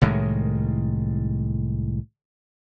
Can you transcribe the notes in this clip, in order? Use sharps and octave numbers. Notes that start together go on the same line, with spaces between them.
C2 A2 D#3 G#3